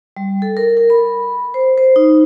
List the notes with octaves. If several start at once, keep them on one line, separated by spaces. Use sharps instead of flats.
G3
A4
A#4
A#4
B5
C5
C5
D#4